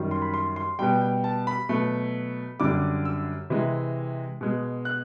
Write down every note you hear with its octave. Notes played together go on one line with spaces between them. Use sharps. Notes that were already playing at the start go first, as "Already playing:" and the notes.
Already playing: F#2 D#3 G3
C6
B5
C6
C6
B2 G3 G5
G5
A5
B5
B2 F#3 A3
F#2 D3 G3 D6
E6
C3 E3 G#3
B2 G#3
F#6